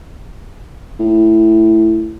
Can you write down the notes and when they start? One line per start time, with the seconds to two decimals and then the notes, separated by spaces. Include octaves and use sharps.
1.00 A2